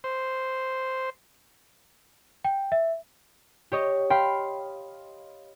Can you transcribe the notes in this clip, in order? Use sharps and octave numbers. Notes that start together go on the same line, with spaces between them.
C5
G5
E5
G4 C#5 D#5
F5 G5 B5 C6